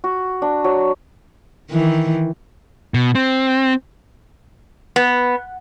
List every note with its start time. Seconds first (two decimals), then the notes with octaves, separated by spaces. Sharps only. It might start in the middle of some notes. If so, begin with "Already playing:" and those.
0.04 F#4
0.42 D4
0.64 F#3
1.72 D#3 E3
2.94 B2
3.15 C4
4.96 B3